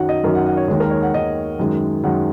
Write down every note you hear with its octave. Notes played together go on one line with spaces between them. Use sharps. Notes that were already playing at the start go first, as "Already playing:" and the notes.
Already playing: F#2 D#3 F#3 F#5
D#5
F#2 D#3 F#3 A#4
F#5
F#5
C#5
D#2 D#3 G#3 C#5
A#4
C#5
F#5
D#2 D#3 G#3 D#5
F#2 D#3 G#3
F#2 D#3 G#3 F#5